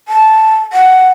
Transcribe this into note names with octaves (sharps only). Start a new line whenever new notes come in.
A5
F#5